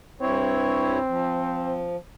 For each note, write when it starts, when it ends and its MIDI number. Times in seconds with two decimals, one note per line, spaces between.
0.21 0.99 43
0.21 1.87 60
0.21 0.99 64
0.21 0.99 73
1.09 1.96 53